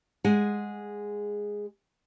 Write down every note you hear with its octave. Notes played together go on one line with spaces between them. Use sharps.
G#3 G#4 F#5 G#5